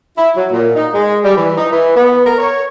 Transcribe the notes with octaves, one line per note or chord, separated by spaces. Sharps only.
E4
F#3
A#2
D#4
G#3
G3
E3
D#4
E3
B3
A#4
C#5